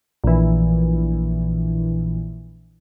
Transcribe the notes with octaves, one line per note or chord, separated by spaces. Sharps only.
A#1 E3